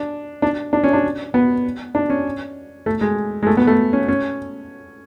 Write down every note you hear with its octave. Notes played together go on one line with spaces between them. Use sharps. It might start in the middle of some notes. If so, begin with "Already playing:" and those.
Already playing: D4
D4
D4
C#4
D4
B3
D4
C#4
A3
G#3
G#3
A3
B3
A3
C#4
C#4